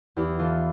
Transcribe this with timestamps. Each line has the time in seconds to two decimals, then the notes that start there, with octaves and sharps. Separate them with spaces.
0.16 E2 E4 G4
0.39 E3 F4 A4